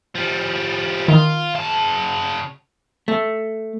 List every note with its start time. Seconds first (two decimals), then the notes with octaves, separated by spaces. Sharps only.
0.16 F3 G3
1.08 D#3 F4
1.55 C#3 A5
3.08 A3